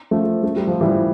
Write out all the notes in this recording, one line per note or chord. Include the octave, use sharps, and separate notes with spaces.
F3 A3
A3
G3
F3
E3 G3